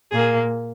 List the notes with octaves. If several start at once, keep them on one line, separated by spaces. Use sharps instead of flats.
A#2 A#3 G#4